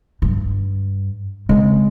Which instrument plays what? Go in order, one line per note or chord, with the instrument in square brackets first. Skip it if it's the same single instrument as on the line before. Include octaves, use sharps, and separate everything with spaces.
[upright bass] G2
[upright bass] C#3 C4 [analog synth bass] G#3